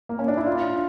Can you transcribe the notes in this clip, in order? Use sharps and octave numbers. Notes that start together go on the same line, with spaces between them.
A#3
C#4
D4
E4
D4 F4